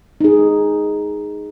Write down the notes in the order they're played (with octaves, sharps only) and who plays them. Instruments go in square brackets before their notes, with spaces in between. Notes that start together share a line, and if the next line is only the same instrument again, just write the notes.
[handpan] D#4 G#4